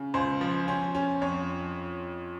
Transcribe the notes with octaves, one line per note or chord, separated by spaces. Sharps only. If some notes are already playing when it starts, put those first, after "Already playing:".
Already playing: C#3
C#2 C5
F3
C#4
C#4
F2 C#5